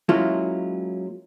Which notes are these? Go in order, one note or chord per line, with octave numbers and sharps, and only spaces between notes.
F#3 G#3 A#3 C#4 E4 F4